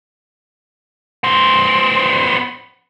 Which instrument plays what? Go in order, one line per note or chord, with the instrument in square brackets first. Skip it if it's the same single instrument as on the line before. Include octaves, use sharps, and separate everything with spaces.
[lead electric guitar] B3 C5